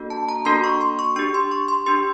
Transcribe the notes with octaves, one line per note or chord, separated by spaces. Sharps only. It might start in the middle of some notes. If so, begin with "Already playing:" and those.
Already playing: A#3 D4 F#4 A4
A5
A#5
A#3 D4 F#4 A4 C6
C#6
C6
C#6
D4 G4 C#6
C6
C#6
C6
D4 G4 C6